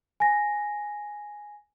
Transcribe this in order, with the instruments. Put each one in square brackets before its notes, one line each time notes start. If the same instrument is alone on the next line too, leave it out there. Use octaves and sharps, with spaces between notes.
[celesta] G#5 A#6